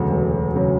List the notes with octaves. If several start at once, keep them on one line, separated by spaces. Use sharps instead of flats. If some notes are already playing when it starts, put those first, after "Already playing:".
Already playing: E1 D2 C#3 F#3 A4
E1
C#3 F#3